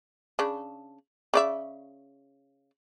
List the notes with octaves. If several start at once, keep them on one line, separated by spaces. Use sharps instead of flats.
C#3 D4
C#3 D5 E5